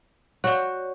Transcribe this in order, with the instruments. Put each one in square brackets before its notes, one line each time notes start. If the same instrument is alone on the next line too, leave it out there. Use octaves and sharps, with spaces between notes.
[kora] F#4 [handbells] C#5 D5